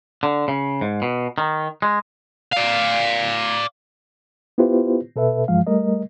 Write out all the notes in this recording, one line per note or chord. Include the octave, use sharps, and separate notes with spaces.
D3
C#3
G#2
B2
D#3
G#3
D5 F5
B3 E4 F4 G4 B4 C5
B2 A4 B4 E5
G2 E3 F3 G#3 F5
G3 A3 A#4 D#5